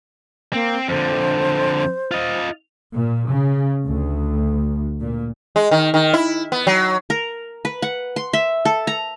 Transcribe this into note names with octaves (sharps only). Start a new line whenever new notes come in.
A#3 C4
F2 D3 C5
F4 D#5
A#2
C#3
D2
A#2
G#3
D#3
D#3
E4
B3
F#3
A#4
B4
F#5
C6
E5
A4
A#5